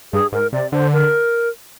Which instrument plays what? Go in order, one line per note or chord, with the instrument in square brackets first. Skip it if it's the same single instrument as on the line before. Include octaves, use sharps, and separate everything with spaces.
[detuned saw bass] G2 [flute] G#4
[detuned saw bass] G#2 [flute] A#4
[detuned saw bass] C3 [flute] D5
[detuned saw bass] D3 [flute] C5
[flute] A#4